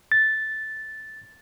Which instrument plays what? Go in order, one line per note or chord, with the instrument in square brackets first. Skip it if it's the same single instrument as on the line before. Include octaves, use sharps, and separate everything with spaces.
[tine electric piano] A6